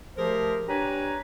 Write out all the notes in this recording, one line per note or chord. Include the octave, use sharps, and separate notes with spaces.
F3 A3 G4 G#4 A#4 C5
D4 G4 B4 C#5 G#5 A#5